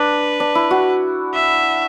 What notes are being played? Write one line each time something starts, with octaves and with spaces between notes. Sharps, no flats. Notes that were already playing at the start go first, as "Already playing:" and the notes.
Already playing: D4 B4
D4
E4
F#4
E5